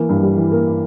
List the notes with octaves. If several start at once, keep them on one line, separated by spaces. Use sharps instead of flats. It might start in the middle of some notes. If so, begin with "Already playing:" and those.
Already playing: E3 A#3
G2
G3
E3
A#3